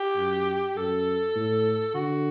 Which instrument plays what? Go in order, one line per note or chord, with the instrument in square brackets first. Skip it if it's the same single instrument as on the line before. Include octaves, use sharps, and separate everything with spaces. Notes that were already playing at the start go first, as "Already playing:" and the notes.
Already playing: [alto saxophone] G4
[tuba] F#2
[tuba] F#2 [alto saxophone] A4
[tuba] A2
[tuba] D3 [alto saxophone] F#4